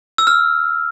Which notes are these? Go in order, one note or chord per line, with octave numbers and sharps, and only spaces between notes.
E6
F6